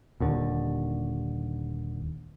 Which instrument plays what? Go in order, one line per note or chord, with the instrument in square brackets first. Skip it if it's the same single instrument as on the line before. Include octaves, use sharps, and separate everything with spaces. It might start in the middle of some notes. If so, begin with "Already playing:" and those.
[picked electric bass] D#1 D#2 D3